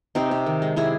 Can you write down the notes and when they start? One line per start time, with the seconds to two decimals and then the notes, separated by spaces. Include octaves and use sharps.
0.15 C3 C4 D#4
0.31 C3
0.46 D#3
0.62 G#3
0.76 C3 E4 G#4